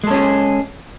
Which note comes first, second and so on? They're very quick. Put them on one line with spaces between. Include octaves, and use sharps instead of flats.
G#3 A4 C#4 G#4